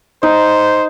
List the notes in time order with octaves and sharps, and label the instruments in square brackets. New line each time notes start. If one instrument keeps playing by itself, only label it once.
[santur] D#4 [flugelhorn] C5